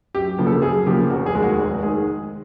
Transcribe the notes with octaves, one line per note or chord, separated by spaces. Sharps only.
F#2 G4
C#3 F3 A#3
A4
F#2 G#4
C#3 F3 A#3 G4
F1 F#4
G#4
D#2 D#3 G#3
F#4
F1
D#3 G#3 G#4